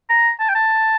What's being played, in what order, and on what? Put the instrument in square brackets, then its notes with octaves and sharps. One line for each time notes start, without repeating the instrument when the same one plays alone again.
[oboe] A#5
A5
G5
A5